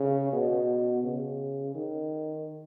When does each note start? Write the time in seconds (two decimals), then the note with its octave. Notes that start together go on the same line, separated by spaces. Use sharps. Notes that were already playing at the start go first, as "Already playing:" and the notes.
Already playing: C#3
0.32 B2
1.04 C#3
1.75 D#3